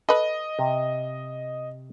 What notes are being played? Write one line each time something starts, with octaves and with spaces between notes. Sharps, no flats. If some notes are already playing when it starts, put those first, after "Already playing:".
A4 B4 D#5
C3